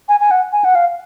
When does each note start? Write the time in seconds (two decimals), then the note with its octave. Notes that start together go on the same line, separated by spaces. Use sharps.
0.09 G#5
0.20 G#5
0.31 F#5
0.52 G#5
0.64 F#5
0.75 F5